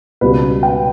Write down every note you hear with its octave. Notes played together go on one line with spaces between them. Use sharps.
C#2 B2 G3 B4
G5